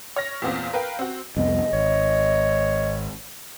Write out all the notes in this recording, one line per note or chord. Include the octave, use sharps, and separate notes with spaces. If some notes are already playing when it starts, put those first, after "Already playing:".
C#5 F6 A#6
E2 A#2 B3 C4 F5
A#4 B4 F5 G5
C4 F#4
C2 F2 B3 D#5
G#1 C#5